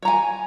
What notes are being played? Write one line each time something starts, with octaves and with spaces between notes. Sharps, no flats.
C#5 G#5 A#5